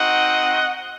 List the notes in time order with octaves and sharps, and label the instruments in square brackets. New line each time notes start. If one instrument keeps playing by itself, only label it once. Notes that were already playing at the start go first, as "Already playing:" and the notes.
Already playing: [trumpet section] C4 D#4 F#4 D#5 F#5